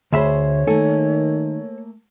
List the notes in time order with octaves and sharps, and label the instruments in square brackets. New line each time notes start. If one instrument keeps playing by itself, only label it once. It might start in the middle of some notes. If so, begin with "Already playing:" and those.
[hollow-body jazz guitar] D2 E5 B5 [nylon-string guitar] G#4 C5 [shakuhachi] C#5
[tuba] D#3 [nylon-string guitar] A3 A#3 G#5 [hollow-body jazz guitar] A4